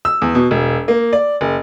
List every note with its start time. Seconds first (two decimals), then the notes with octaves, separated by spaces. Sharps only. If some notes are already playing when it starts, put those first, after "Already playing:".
0.05 E6
0.22 E2
0.35 B2
0.51 E1
0.88 A#3
1.13 D5
1.41 F#1